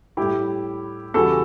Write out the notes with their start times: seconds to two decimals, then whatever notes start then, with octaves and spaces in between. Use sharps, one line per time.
0.17 A2 G3 E4 G4
1.14 E2 C#3 E3 G3 F#4 A4